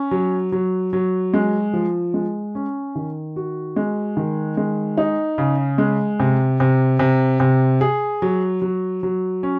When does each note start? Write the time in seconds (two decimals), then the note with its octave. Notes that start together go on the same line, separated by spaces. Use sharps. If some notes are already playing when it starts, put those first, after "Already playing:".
Already playing: C#4
0.11 F#3
0.52 F#3
0.93 F#3
1.34 G#3
1.73 F3
2.14 G#3
2.55 C#4
2.95 D#3
3.36 F#4
3.76 G#3
4.17 D#3
4.57 G#3
4.97 D#4
5.38 C#3
5.78 G#3
6.20 C3
6.60 C3
6.99 C3
7.40 C3
7.81 G#4
8.22 F#3
8.62 F#3
9.03 F#3
9.43 C#4